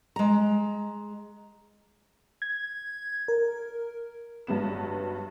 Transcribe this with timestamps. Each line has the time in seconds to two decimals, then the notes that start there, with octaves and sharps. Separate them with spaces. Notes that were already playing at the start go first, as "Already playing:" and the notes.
0.16 G#3 A#5
2.42 G#6
3.28 A#4
4.47 G1 G2 F#3 B3 E7